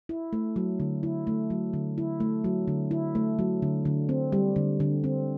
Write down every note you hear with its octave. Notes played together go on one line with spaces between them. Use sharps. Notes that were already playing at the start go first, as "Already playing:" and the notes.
E4
A3
F#3
D3
E4
A3
F#3
D3
E4
A3
F#3
D3
E4
A3
F#3
D3
D3
C4
G3
D3
D3
C4